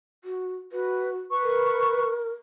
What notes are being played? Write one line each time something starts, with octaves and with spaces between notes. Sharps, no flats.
F#4
F#4 B4
B4 C#6
A#4